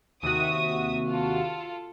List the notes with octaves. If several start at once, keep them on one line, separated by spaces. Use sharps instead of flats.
D#2 C3 F#4 E5 D#6
F4 A4